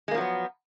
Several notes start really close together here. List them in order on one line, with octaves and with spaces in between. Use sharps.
G#3 A#3 F3 F#3 B3